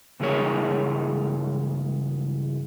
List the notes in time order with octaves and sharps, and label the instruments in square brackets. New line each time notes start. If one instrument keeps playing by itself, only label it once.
[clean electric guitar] C#2 G2 E3 G#4 A#4 C#5